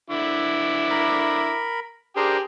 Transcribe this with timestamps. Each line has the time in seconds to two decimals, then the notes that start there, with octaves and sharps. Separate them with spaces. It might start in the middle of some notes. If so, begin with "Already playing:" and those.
0.11 D3 E4 D6
0.90 A#4 B5
2.16 D4 G4 G#4 A#4 C5